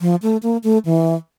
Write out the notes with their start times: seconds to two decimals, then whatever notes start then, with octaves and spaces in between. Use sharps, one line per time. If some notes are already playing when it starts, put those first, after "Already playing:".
0.01 F3
0.22 A3
0.43 A#3
0.64 A3
0.85 E3